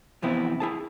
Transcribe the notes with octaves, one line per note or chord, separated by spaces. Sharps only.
F2 C3 E3 B3 C4 E4
E4 G#4 A5